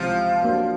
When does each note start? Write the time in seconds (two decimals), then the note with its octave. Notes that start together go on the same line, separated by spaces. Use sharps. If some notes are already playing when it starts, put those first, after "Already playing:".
Already playing: C#2 C3 E3 F3
0.42 F#3 A#3 D4